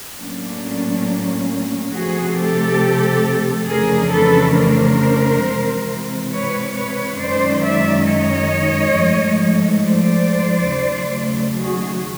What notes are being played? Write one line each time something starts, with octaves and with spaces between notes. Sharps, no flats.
A2 F#3 A#3 C#4 D4
C3 F3 A3 F#4 G#4
G4 A4
F2 C#3 E3 A3 D4 G#4 A#4
A4 B4
A#4 C5
C3 E3 G#3 C4
B4 C#5
B4 C#5
F#2 D#3 G#3 C#4 C5 D5
D5 E5
C#5 D#5
G#2 F3 A3
C5 D5
D#2 C#3 F#3 A3
F#4 G#4